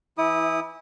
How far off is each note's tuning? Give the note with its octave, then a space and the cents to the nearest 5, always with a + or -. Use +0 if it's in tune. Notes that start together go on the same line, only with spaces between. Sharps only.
E3 +0 E4 -25 D#6 -20